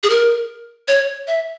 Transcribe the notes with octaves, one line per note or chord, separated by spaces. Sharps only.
G#4
A#4
C#5
E5